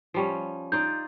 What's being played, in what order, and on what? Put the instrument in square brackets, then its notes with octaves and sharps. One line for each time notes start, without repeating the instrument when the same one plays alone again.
[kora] F3 G3 C#4
[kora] D#4 F4 D5 [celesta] G6